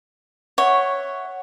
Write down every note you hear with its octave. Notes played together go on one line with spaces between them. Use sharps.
C#5 E5 F#5 C#6